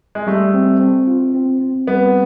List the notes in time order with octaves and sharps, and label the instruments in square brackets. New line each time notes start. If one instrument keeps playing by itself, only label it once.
[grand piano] G#3
[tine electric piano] G3 [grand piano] A3
[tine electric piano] C4
C4
F4
C4
C4
[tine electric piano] G3 [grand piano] B3